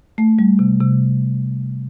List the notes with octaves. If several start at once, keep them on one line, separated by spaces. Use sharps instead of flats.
A3
G3
C3
C3